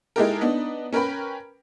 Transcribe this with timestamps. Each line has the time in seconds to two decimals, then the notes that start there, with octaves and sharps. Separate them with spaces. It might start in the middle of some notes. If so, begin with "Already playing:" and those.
0.16 G#3 D#4 E4 G4 A4 A#4
0.41 B3 D4 D#4
0.93 C#4 A#4 B4 G5 B5